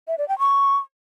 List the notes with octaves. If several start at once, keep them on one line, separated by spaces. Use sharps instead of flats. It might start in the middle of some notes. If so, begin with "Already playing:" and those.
E5
D5
G5
C#6